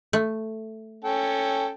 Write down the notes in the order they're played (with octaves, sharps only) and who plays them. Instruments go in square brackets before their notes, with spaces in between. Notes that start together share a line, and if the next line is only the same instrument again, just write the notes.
[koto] A3
[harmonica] C#4 A4 G5